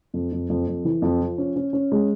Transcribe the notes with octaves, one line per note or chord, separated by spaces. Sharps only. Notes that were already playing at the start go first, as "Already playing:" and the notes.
F2
F2
F2
F2
E3
F2
F3
C#4
C#4
C#4
G#3